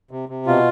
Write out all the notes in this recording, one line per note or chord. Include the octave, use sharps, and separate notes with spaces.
C3
C3
B2 F4